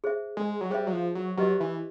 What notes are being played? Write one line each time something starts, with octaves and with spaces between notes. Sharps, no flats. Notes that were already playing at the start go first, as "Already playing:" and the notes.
G#4 C5 E5
G#3
F#3
G3 G#4 C5 E5
F#3
F3
F#3
F#3 G4 B4 D#5
E3